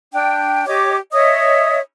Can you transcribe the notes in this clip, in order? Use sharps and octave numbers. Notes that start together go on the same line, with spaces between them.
D4 G5
G4 C#5 D#5 D6
C#5 D#5 E5 D#6